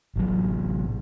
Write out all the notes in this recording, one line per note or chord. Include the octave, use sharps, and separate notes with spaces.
A1 F#3